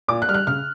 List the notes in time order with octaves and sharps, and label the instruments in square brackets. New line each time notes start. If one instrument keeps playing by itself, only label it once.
[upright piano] A#2 D6
F#6
G3 F6
F#6
C#3 F6